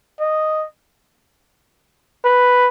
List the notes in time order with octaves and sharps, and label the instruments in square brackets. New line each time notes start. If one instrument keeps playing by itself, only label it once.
[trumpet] D#5
B4